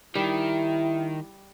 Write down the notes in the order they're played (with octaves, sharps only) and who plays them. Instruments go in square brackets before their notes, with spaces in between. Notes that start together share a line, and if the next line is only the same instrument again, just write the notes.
[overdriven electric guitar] D#3 [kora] G3 [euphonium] E4